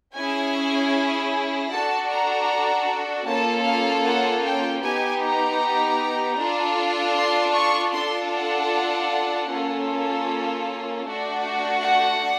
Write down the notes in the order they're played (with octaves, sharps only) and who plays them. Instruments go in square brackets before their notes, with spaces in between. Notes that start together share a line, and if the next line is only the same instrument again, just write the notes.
[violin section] C#4 E4 G#4 G#5
D4 F#4 A4 A5
A#5
A#3 C#4 F4 A4 A5
F5
F#5
G5
B3 D#4 G4 G#5
A#5
D4 F4 A4
C6
C#6
D4 F4 A4 C6
F#5
A#3 C#4 F4 A4
A3 D4 F#4
F#5